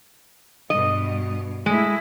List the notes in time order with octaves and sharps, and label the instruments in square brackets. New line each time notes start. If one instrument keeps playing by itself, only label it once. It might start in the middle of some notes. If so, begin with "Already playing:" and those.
[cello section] G2 B2 [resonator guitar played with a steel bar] D#5
[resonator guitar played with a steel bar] G#3 [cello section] A3 E4